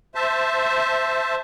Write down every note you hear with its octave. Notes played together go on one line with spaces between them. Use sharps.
C5 E5 A5